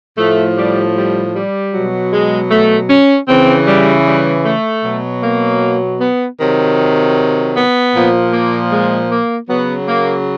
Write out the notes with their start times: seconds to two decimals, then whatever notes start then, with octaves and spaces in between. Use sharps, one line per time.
0.18 A2 F3 A3
0.57 G3
0.96 G3
1.34 G3
1.73 B2 F#3
2.12 G#3
2.51 A3
2.89 C#4
3.28 C#3 E3 C4
3.67 G3
4.06 G3
4.44 A3
4.84 B2 F#3
5.22 A#3
6.00 B3
6.39 C3 D#3 F#3
7.55 B3
7.94 A#2 F3
8.32 A#3
8.72 G#3
9.10 A#3
9.49 C#3 F#3 B3
9.87 A#3